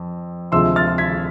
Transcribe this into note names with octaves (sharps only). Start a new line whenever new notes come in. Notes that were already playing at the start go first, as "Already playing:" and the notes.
Already playing: F2
D2 C3 F3 G#3 C6 E6
F6 A6
G#6 B6